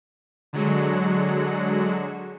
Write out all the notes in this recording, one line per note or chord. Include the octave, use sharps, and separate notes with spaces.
D3 F#3 G#3 F#4